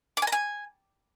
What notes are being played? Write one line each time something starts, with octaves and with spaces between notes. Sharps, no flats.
D6
G#5
A#5
G#5